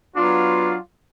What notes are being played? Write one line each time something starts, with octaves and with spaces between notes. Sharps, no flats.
F#3 B3 D4 F4